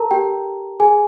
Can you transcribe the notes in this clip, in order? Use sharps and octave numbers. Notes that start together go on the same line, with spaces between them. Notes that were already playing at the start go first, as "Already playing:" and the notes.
Already playing: A4 A#4 A5 A#5
G4 G5
G#4 G#5